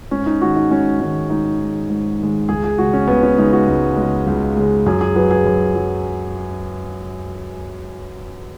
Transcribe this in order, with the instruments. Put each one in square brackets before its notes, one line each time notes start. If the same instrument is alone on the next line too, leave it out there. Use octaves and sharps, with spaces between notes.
[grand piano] G#2 C#4
D#4
D#3 G#3 F#4
D#4
G#2 C#4
D#3 G#3 C#4
G#2 D#4
D#3 G#3
G#2
D#3 G#3
C#2 G#4
G#4
C#3 G#3 F#4
C#4
C#2 B3
C#4
C#3 G#3 D#4
F#4
C#2
G#3
C#3
C#2
C#3 G#3
F#2 G#4
G#4
F#3 B4
G#4
F#2
F#3